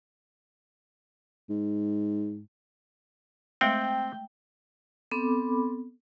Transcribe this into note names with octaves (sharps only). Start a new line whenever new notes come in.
G#2
G#3 A3 C4 G5
B3 C4 A4 B5 D6